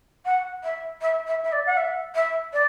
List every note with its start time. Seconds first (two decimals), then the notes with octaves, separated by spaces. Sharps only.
0.25 F#5
0.63 E5
1.01 E5
1.27 E5
1.44 E5
1.52 D5
1.66 F#5
1.77 E5
2.15 E5
2.53 D5